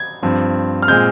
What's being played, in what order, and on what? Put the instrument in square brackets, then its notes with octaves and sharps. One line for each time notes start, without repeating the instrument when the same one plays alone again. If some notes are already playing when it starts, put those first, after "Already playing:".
Already playing: [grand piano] G#6
G2 F3 C4
F6
A#2 G#3 C4 G6